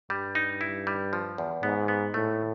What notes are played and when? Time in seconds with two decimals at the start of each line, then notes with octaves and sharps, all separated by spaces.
0.10 G2 G3
0.35 D#4
0.61 E4
0.87 G3
1.13 F3
1.38 E2
1.63 G#2 B3
1.88 B3
2.14 A2 A3